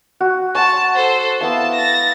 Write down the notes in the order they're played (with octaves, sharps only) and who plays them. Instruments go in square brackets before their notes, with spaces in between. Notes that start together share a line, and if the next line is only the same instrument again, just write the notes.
[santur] F#4
[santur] F#5 C6 C#6 [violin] A5
[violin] A4 C5
[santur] B3 E4 F5 [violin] A5
[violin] A6 A#6